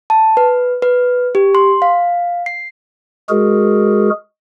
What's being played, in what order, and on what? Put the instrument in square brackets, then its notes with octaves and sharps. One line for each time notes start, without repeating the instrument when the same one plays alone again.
[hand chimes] A5
B4
B4
G4
C6
F5
C7
[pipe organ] G#3 F#4 G#4 A#4